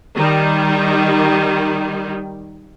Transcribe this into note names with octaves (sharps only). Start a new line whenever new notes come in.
D#3 G3